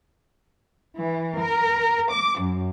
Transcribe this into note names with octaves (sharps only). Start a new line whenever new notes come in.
E3
A#4
D6
F#2